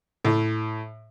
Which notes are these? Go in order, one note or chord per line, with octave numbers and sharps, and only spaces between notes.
A2